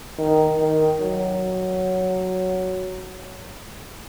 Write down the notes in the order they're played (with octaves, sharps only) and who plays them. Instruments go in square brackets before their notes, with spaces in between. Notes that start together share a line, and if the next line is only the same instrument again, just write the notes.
[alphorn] D#3
D#3
F#3